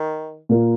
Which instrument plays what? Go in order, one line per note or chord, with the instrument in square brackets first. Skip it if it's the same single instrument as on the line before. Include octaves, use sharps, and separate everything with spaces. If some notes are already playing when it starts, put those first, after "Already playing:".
Already playing: [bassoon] D#3
[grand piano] A#2 A#3 F4